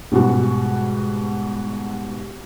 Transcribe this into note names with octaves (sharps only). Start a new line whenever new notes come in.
G#2 B2 G3 G#3 F#4